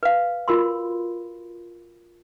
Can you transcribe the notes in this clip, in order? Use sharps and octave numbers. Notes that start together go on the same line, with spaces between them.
B4 F5
F4 F#4 A#4 B5 C6